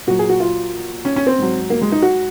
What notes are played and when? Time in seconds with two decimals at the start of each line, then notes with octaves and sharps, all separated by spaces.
0.07 A#2 F#3 F#4
0.19 G#4
0.29 F#4
0.40 F4
1.05 C#4
1.16 C#4
1.27 C4
1.38 G#2 F#3
1.70 A#3
1.81 G#3
1.92 D#4
2.02 F#4